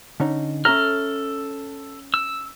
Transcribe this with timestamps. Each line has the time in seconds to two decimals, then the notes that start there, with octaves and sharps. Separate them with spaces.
0.20 D3 C#4 D#4
0.65 C#4 A4 E5 A#5 F6
2.14 E6